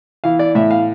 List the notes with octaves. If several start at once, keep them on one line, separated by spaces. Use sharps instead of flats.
E3 F5
D5
A2 E5
F5